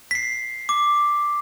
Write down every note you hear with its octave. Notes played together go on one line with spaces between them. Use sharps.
B6 C7
D6